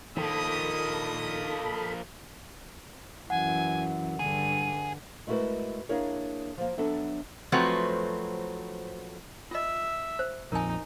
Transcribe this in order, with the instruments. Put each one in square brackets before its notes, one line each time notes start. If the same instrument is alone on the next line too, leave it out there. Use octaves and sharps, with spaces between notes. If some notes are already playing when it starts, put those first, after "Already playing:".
[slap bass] D#3 [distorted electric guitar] F3 A#3 [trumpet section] D4 D#5 D#6 [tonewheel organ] A4 B5
[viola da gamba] F#2 E3 [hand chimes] F#5 [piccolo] G#5
[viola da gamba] G2 D3 [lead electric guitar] G#4 [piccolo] D#7
[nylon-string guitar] G#3 A3 E4 F#4 A#4 B4
A#3 D4 E4 G#4 A#4 C#5
F3 A#3
F#3 B3 D4 A4 E5 A5
[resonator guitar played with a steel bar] F3 F#3 A3 C4 F#4 B4
[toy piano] F4 D#5 [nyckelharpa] E5
[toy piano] C5
[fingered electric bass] A#1 F2 [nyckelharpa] D#4 [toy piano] A#4 G#5